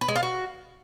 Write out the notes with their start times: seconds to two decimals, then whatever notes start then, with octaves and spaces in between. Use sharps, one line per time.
0.01 B4
0.08 G#3
0.16 F4
0.23 F#4